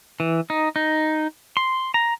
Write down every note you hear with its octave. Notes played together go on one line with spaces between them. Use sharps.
E3
D#4
D#4
C6
A#5